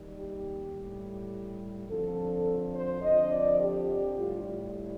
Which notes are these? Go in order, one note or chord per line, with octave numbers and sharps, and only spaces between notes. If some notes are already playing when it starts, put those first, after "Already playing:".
Already playing: D#2 D#3 G3
G4
A2 G3
F2 D3 F3 A4
C5
F2 D3 F3 D#5
D5
G4
A2 G3 F4
F4